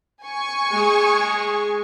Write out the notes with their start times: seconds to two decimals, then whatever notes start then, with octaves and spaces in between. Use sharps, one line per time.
0.24 G#5 C#6
0.71 G#3 G#4